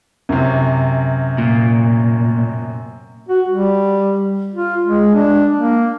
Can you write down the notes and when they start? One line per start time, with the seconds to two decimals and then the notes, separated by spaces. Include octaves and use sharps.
0.29 F#2 C3
1.38 A#2
3.29 F#4
3.49 G3
4.54 F4
4.87 G#3
5.15 D4
5.56 A#3